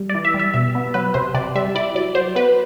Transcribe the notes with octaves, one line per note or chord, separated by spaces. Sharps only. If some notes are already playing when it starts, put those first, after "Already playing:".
Already playing: G3
D5
E3
E5
G3
E5
B2 E5
B3
F#3 B4
C3 C5
C3 D5
G3 E5
E4 D5
F#3 D5
F#3 C5
B3 B4